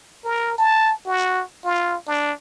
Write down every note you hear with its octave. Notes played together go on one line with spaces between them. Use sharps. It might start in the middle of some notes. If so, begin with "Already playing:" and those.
A#4
A5
F#4
F4
D4